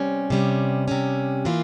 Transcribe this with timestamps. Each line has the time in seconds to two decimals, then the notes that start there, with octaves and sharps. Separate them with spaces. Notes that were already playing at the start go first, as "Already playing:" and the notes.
Already playing: C3 G3 C#4
0.30 C3 G3 C#4
0.88 C3 G3 C#4
1.45 E3 A#3 F4